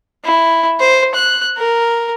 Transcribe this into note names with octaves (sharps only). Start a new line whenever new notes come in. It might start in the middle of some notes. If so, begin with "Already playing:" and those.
E4
C5
F#6
A#4